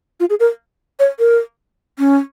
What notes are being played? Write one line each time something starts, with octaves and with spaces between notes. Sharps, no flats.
F4
G#4
A#4
C#5
A#4
C#4